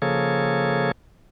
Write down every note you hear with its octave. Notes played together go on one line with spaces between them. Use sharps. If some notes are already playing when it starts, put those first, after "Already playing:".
C#3 F3 A#3 G#4 A4 C#5